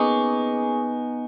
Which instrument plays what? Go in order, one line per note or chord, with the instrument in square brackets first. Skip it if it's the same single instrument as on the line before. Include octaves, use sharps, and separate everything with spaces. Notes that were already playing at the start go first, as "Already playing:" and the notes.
Already playing: [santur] A#3 C#4 G#4 D#5 [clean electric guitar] B3 D#4